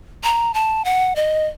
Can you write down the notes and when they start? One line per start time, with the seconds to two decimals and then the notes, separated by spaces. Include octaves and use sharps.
0.24 A#5
0.54 A5
0.85 F#5
1.16 D#5